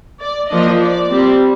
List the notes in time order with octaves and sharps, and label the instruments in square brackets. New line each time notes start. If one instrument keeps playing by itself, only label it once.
[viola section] D5
F3 A#3 D4 D#5
D5
G3 C4